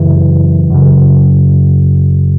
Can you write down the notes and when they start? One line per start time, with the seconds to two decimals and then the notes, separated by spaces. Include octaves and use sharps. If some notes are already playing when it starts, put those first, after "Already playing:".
Already playing: F#2 C#3 E3
0.70 F#2 C#3